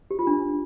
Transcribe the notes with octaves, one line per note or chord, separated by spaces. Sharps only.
G4
F4
D4